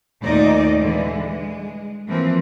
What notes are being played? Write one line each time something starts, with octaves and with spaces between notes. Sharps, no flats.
D#2 A#2 A3 D#4 D5 D#5
D3 E3 G3 G#3
G#3
E3 F3 A#3 C4